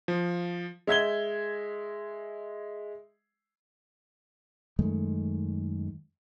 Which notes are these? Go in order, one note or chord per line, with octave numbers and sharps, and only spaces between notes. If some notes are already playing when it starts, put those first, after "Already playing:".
F3
G#3 E5 G#6 G7
F#2 D#3 G#3 A3